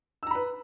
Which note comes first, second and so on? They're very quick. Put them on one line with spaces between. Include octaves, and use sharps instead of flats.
E6 A#5 B5 B4